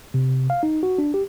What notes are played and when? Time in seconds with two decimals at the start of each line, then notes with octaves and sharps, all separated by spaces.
0.14 C3
0.50 F5
0.63 D#4
0.83 F#4
0.98 D4
1.14 G4